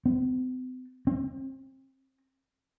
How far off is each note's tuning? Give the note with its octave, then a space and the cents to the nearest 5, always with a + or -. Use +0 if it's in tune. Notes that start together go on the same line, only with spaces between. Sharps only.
C4 -45
C4 +30